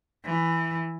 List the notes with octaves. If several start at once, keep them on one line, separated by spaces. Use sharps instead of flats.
E3